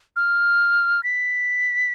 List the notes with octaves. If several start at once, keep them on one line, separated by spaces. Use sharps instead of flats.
F6
B6